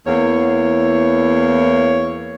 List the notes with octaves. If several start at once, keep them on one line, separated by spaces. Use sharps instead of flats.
E2 A#3 E4 C#5